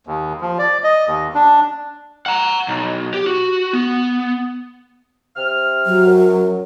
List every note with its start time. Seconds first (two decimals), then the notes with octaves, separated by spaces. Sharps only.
0.07 D#2
0.41 F3
0.59 D5
0.84 D#5
1.07 D#2
1.35 D4
2.26 F#5 A#5
2.68 B1
3.14 G4
3.27 F#4
3.73 B3
5.35 C3 F6
5.86 F#3
6.06 F#2